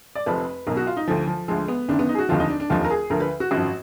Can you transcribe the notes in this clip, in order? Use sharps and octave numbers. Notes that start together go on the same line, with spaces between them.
D5
F1 F2 F3 B4
B1 B2 A#4
F#4
F4
D#4
D2 D3 F3
F3
D2 D3 F3 G#3
B3
F#1 F#2 D#3 D4
B3
D#4
G#4
F#4
F1 D#2 D3 F3 F4
D#4
D4
D4
F1 D#2 D3 F3 F4
A#4
G#4
D2 D3 F3 A#4
B4
F#4
G#1 F#2 F3 F#4